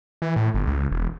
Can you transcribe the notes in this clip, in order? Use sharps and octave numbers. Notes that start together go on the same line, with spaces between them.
E3
A2
G1
C#2
E1